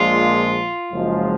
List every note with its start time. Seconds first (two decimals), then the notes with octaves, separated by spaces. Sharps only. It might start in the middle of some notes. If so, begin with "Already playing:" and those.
Already playing: A#1 A#2 F3 G#3 F4
0.92 F#1 F#2 F3 G#3